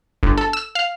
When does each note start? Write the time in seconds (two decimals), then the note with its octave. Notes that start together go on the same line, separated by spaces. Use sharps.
0.23 G1
0.38 A4
0.53 E6
0.75 F5